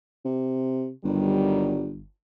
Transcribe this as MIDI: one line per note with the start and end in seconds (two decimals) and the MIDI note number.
0.25 0.90 48
1.04 2.06 31
1.04 1.88 51
1.04 1.88 54
1.04 1.88 55